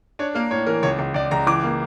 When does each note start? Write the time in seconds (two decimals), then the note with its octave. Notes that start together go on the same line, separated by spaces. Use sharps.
0.19 D4 C#5
0.35 A#3 A#4
0.51 A2 C#5
0.66 E3 A#4
0.83 C#2 C#5
0.99 C#2
1.14 C#2 D5
1.31 C#2 A#5
1.46 E3 D6
1.63 A#3